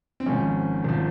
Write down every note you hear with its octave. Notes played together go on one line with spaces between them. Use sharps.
C4
G#1 G#2 F3 C#4
G#1 F3